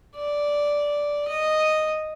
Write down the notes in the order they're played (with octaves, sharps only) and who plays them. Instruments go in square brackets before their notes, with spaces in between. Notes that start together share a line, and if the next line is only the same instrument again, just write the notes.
[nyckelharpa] D5
D#5